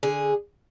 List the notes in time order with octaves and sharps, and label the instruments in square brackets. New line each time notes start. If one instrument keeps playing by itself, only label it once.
[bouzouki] D3 G#4